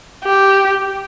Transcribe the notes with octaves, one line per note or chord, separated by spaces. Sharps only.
G4